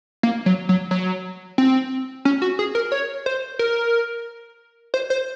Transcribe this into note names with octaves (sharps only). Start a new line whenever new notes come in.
A#3
F#3
F#3
F#3
C4
C#4
F#4
G#4
A#4
C#5
C5
A#4
C5
C5